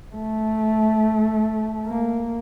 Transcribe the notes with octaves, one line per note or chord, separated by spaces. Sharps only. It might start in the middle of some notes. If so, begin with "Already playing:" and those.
A3
A#3